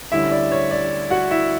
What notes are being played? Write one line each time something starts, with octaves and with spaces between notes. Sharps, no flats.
D2 D3 G3 C#4 E4 E5
D5
C#5
D5
F#4 F#5
E4 E5